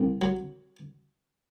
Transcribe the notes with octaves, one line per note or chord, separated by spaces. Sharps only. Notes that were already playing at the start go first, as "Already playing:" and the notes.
Already playing: C2
F#3